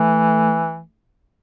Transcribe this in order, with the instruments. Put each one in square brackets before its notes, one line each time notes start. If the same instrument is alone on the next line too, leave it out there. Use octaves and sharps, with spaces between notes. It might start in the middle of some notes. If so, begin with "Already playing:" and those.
Already playing: [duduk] E3 [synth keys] A3